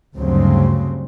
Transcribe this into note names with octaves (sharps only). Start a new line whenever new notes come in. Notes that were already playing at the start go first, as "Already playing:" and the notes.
D2 G2 C#3 F#3 C4